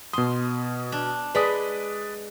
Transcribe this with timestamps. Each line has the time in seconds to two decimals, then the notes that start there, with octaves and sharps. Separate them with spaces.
0.13 B2 C6 D#6
0.92 D4
1.35 G#3 B4 D5 B5 D#6